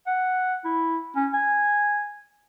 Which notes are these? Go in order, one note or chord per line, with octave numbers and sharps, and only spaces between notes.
F#5
E4
C#4
G#5